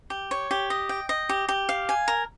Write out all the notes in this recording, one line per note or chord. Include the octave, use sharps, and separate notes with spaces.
G4
C#5
G4
D#5
G5
D#5
G4
G4
F5
G#5
A#4